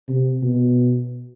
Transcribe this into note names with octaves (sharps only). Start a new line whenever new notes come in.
C3
B2